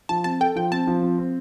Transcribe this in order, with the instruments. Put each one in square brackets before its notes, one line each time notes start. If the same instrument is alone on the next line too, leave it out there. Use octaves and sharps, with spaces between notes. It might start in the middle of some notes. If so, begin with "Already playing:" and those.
[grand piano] F3 [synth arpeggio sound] A5
[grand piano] C4 [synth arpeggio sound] A5
[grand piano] A4 [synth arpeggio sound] G5
[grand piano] F3 [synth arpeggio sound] G5
[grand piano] C4 [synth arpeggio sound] A5
[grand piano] F3
C4
C4